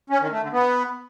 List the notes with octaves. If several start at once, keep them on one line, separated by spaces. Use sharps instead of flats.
C#4
D#3
A3
D3
B3